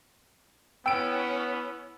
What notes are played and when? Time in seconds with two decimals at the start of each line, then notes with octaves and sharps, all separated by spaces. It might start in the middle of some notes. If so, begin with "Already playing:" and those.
0.86 B3 C#4 E4 G5 E6 D7